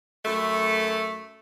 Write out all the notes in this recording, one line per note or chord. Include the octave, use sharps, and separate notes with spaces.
F#2 A3